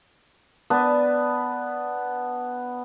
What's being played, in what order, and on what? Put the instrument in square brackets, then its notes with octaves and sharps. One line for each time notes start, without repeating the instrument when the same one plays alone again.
[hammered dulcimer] B3 [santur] D4